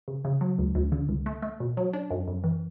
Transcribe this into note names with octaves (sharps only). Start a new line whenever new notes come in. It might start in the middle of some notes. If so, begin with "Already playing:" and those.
C#3
C#3
F#3
D2
D2
D3
C#2
A3
A3
B2
F#3
D4
F#2
F#2
E3